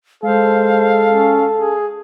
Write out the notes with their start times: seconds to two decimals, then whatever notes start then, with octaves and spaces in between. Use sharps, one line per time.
0.23 G#3 A4 C5 F5
1.09 C#4
1.57 G#4